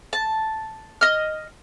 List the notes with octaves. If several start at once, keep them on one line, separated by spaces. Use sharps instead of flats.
A5
D#5 F6